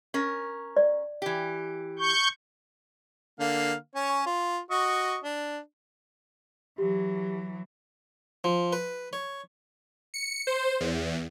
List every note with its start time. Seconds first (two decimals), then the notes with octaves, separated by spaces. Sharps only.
0.14 C#4 A#4
0.77 D5
1.22 E3 G4
1.99 C#6 G6
3.40 D3 A#3 F5
3.95 C#4 C#5
4.26 F4
4.71 F#4 D#5 C#6
5.24 D4
6.78 E3 F#3 G4
8.44 F3
8.73 B4
9.13 C#5
10.14 C#7
10.47 C5
10.80 E2